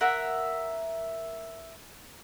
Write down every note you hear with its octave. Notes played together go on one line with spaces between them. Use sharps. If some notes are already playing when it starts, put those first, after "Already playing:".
A#4 E5 F#5